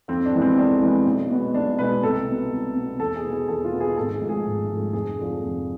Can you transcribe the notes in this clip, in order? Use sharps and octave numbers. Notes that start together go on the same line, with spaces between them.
F2 C4
D4
E3 G#3 B3
C4
F2 D4
E3 G#3 B3
B1
B2 G#3 B3
B1 D4
B2 G#3 B3 B4
C2 A4
B2 B3
C2
B2 B3
E2 A4
G#4
B2 B3
G#4
E2 A4
F4
B2 B3
G#4
G#1 A4
G#4
G#2 F3 A3
G#4
G#1
G#2 F3 A3
F1 G#4
F2 D3 F3
F1